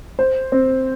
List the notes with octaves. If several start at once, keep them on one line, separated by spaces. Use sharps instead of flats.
C5
C4